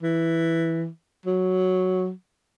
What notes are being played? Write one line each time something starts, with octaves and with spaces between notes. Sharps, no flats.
E3
F#3